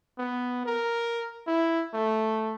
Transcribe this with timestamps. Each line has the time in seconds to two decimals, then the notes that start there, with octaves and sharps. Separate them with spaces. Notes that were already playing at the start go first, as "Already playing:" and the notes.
0.18 B3
0.66 A#4
1.47 E4
1.94 A3